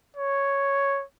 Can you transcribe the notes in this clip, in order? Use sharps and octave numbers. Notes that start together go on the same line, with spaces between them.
C#5